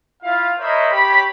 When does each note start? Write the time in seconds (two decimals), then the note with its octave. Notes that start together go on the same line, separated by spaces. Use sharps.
0.23 E4 F4 F5
0.59 A#4 C5 C#5 D#5 E5 B5
0.91 G4 C#5 B5